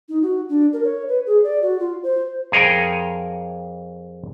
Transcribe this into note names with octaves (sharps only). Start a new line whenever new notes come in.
D#4
F#4
D4
A#4
C#5
B4
G#4
D5
F#4
F4
C5
F2 G#4 A#4 C#5 G5 G#5